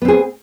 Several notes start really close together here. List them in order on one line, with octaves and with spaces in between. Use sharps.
B3 C4 G#4